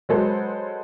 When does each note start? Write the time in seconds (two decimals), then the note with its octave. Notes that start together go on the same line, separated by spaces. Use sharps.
0.09 F#3 G#3 A4 B4 C5